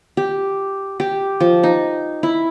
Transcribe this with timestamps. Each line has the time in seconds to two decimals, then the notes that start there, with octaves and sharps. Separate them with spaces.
0.17 G4
1.00 G4
1.40 F3
1.63 D#4
2.23 E4